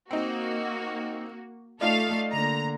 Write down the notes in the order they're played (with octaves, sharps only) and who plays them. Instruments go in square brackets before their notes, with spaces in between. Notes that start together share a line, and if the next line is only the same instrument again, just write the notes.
[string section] A#3 F#4 [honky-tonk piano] C4 D#4
[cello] A3 [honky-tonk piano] D#4 F4 D5 [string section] A4 F5
[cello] D3 A#3 [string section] A#5